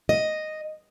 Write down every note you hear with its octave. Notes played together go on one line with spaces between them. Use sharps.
D#5